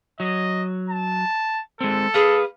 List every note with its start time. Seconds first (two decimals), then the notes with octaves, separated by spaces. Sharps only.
0.20 F#3 D#5
0.90 A5
1.81 G#3 C4 A4
2.14 G#4 B4 F5